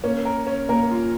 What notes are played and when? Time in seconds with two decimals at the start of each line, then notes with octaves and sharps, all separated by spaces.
0.04 A#3 C#4
0.25 A#4
0.47 C#4
0.69 A#3 A#4
0.91 F4